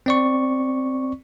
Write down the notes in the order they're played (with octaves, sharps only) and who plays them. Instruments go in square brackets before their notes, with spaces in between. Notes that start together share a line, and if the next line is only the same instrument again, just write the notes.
[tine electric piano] C4 D5 C#6